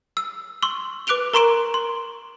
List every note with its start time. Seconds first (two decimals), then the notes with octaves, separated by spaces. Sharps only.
0.17 E6
0.63 C6 C#6 E6
1.07 B4 D6 F#6 D7 F7 G7
1.33 A#4 A#5 C6 C#6 D7 E7
1.74 C6